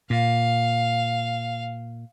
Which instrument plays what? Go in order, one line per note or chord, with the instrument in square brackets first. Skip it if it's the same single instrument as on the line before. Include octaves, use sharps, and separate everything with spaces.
[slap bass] A#2 [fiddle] F5